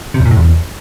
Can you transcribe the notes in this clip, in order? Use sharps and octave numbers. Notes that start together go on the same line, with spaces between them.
C3
E2
A#2
A2
E2